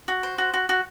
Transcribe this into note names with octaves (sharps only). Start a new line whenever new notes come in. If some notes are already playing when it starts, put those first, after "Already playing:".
F#4
C5
F#4
F#4
F#4